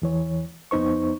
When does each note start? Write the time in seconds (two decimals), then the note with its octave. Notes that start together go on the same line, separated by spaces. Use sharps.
0.02 E2 E3 C#5
0.71 F2 B3 D#4 C5 C#6